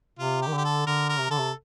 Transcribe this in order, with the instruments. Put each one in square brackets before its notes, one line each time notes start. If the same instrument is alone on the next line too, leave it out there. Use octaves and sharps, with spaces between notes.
[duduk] C3 [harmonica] F4
[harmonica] G4
[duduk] D#3
[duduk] D3 [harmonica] G4
[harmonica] A4
[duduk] D3 [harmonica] A#4
[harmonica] A#4
[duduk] C3
[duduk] D3 [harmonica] A4
[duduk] C3